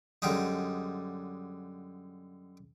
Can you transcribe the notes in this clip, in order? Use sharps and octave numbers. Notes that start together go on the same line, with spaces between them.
F#2 D3 G3 G#3 D#4